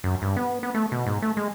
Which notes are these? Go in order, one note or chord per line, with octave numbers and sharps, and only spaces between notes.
F#2
G2
B3
B3
A3
B2
G#2
A3
G#3